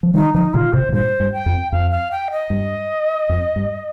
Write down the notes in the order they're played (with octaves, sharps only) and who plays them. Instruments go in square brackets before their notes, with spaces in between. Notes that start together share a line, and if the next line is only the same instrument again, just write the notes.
[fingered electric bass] F3
[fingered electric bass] D#3 G3 [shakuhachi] D#4
[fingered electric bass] D3 F3 [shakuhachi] D#4
[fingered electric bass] A#2 D3 [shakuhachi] F4
[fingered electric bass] A2 C3 [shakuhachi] C5
[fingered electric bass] C3
[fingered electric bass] G2 A#2 [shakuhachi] C5
[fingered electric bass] G2
[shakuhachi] G5
[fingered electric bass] F2
[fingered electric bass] F2 [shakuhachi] F5
[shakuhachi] F5
G5
D#5
[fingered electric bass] G2
F2
G2